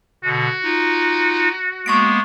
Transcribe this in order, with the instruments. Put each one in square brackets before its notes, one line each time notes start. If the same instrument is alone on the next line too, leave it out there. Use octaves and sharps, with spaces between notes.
[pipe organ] B2 D3 [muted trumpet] F#4
[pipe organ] D#4 F4
[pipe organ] G#3 A#3 B3 [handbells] C#6 A#6 D7